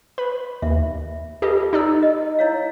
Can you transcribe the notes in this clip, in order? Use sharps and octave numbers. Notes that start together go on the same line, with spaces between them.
B4 B5
D#2 E5
F4 G4 A4 B4 D#5
D#4 D5 E6
D#5
E4 C#5 F5